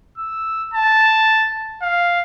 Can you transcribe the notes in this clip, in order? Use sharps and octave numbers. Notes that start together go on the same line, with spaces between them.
E6
A5
F5